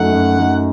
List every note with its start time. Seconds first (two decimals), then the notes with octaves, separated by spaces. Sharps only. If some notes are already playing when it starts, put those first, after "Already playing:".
Already playing: F#2 F#3 A3 D#4 F#5
0.11 F#2
0.38 F#3 A3 D#4